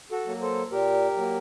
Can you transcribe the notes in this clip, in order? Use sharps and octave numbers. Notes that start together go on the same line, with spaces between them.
F#4 A4
F#3 A#3
A4 C5
A#2 G4 A#4
F#3 A#3